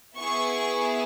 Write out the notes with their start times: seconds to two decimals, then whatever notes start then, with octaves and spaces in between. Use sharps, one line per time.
0.18 B3 E4 G#4 C#6